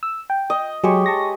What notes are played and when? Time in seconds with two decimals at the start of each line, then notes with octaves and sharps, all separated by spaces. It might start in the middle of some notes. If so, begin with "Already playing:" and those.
0.03 E6
0.30 G5
0.50 D#5
0.84 F#3 G#3 G4 C#5 C#6
1.06 A5 C#6 A#6